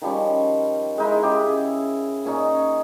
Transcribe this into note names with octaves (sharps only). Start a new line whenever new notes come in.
D#3 F3 G3 C#4
G#3 D#4 E4
C#3 G4 E5
G#4
A#2 C#4 D#4